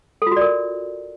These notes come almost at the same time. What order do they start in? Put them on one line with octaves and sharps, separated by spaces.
A4 F4 F#4 D5 A#4